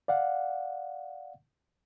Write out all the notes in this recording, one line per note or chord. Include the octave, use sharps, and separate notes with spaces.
D5 F5 F#5